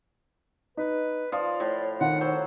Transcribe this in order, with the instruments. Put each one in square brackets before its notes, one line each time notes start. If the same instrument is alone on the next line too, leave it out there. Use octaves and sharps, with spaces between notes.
[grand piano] D#4 [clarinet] B4
[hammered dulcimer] F3 F4 [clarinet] D5 [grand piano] D#6
[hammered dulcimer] A2
[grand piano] D#3 [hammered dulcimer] F4 [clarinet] F#5
[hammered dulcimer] F#3 [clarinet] C5